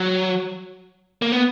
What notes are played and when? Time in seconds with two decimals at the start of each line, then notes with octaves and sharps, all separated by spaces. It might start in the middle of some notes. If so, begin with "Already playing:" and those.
Already playing: F#3
1.22 A#3
1.32 B3